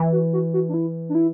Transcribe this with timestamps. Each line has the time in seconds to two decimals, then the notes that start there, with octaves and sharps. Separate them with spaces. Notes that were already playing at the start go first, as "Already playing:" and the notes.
Already playing: E3
0.12 F#4
0.33 F#4
0.53 F#4
0.69 D4
0.74 E4
1.09 D4
1.15 E4